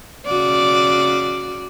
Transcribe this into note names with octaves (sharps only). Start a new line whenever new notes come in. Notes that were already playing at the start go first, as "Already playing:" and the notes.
C#3 F#4 D5